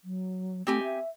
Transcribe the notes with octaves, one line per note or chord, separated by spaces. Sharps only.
F#3
A3 C4 G4 G#5
E5